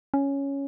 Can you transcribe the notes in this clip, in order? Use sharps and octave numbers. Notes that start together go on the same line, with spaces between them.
C#4